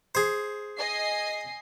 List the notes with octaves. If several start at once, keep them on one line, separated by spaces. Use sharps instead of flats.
G#4 C5
D#5 G#5 C7